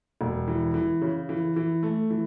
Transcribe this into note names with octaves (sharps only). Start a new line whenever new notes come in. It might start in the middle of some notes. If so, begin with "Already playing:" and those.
E1
E3
E3
C#3
E3
E3
A3
E3